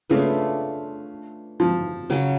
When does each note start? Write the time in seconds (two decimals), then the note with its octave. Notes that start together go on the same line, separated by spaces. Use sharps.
0.10 C#3 A3 D4 F4 B4
1.60 F3
2.10 C#3 F#3 C#4